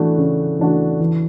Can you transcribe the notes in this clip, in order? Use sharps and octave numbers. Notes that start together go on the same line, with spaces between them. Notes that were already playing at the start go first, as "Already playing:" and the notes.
Already playing: E3 A3 D4 F#4
C#3
E3 A3 D4 F#4
E3